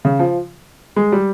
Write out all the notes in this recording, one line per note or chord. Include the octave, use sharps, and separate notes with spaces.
C#3
F3
G#3
G3